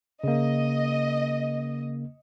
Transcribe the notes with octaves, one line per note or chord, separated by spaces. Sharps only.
C#3 A#3 D#5